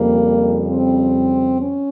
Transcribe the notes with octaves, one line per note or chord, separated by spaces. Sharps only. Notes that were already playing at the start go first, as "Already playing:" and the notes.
Already playing: F2 C#3 G3 A#3
C4
C#4